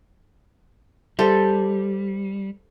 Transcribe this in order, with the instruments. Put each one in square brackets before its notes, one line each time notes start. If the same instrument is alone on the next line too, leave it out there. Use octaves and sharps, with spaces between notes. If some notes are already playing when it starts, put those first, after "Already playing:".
[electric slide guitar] G3 [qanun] G4 A4 C5